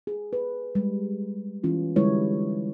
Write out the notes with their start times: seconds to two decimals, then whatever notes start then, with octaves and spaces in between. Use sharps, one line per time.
0.07 G#4
0.33 B4
0.75 G3 G#3
1.64 E3 C#4 F4
1.96 D3 G3 G#3 E4 B4 C#5